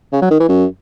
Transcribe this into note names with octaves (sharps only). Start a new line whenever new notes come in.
C#3
F#3
D#3
E3
F#2